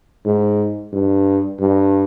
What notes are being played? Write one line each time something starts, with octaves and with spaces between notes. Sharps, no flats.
G#2
G2
G2